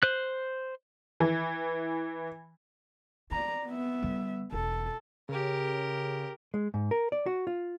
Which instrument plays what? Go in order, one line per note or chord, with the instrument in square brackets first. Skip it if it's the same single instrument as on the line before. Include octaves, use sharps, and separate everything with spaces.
[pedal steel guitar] C5 F#6
[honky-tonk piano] E3
[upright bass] C4 [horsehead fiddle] D5 A#5
[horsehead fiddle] B3 E5
[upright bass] D3 G3
[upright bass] E1 [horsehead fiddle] A4
[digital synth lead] C#3 [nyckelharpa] G4 A#4
[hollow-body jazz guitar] G#3
G#2
A#4
D5
F#4
F4